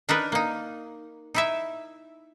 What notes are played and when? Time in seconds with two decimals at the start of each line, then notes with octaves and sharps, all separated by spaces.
0.09 D4 D#4 A#4 B4
0.32 A#3 D#4
1.34 D#4 E4 E5